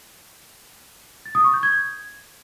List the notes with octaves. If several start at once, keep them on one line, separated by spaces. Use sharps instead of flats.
A6
D#6
C#6
G6
G#6